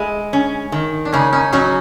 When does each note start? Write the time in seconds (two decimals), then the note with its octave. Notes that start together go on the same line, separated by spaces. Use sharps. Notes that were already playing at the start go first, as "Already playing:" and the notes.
Already playing: G#3 E4
0.33 C#4
0.72 D#3
1.05 D4
1.13 C#3 C#4 D#4
1.32 C#4 D#4
1.53 F#3 C#4 D#4